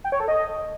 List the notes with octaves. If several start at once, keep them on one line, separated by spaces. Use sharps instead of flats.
G5
C#5
A4
D#5